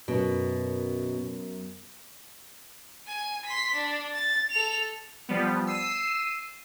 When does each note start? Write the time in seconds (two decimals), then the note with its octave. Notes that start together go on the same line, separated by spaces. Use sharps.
0.08 F#2 B2
3.07 G#5
3.46 C6 B6
3.75 D4
4.14 A6
4.51 A4 F7
5.29 F3 G3 B3
5.67 E6 C7 D#7 E7